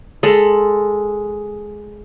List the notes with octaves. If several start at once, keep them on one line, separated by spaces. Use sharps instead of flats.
G#3 A4 B5